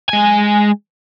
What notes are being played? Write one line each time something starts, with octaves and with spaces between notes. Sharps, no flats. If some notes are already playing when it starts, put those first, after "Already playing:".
G#3 G#5